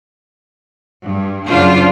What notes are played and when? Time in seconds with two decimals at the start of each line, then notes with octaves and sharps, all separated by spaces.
1.05 G2
1.48 F#2 C#3 D4 F4 C5